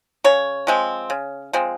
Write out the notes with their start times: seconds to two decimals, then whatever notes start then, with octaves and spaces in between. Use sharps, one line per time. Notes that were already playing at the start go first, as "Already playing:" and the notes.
0.24 C#3 C#5
0.67 F3 G#3 C4
1.10 C#3
1.53 F3 G#3 C4